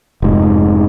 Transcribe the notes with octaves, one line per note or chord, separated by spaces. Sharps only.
F1 G#2